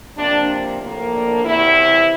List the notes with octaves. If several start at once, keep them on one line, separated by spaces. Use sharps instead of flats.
C3 F3 A#3 D4
A2 F3 A#3
D4
E2 C3 E3 E4